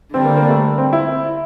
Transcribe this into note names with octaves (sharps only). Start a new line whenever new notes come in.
D3 G3 C4 D4
A#3
A#3
A3
C4
E4